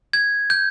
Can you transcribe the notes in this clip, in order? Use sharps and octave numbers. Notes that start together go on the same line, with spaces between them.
G#6
G6